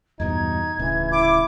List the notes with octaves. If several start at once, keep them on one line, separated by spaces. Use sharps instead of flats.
E2 G2 B2 D#4 G#6
D1 D2 C#3 E3
E4 D6